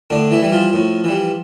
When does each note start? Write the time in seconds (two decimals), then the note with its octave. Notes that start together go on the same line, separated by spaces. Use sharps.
0.10 A2 D3 D4
0.31 E3 E4
0.42 E3 G3
0.52 F3 F4
0.73 A2
1.04 E3 G3